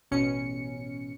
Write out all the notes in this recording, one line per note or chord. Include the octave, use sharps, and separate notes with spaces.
A1 B2 C#4 C#7